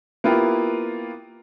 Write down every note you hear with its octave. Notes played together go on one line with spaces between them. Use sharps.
A#3 B3 E4 F4 G4